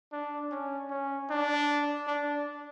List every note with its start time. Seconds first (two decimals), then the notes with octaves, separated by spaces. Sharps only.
0.12 D4
0.51 C#4
0.90 C#4
1.30 D4
2.07 D4